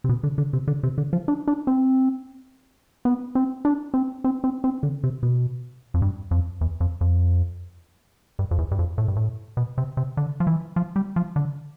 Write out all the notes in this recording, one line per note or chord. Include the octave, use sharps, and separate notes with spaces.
C3
B2
D3
D3
C3
D3
C3
D3
F3
D4
D4
C4
B3
C4
D4
C4
C4
C4
C4
D3
C3
B2
F2
G2
F2
E2
F2
F2
G2
F2
E2
G2
F2
A2
G2
A2
B2
C3
C3
D3
F3
E3
F3
G3
F3
D3